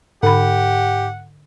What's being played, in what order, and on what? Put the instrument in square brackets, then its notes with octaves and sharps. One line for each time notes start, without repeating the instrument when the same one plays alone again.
[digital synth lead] G#2 [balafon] D3 B5 [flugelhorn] G4 [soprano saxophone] F#5